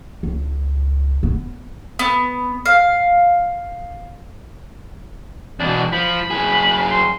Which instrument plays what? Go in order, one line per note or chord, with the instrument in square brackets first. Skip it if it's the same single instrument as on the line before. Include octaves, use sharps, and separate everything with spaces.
[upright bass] C#2
B3
[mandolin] B3
F5
[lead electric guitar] E2 B2 [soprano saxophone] D4
[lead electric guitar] F3 [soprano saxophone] B5
[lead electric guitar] F#2 G#4
[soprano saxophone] C6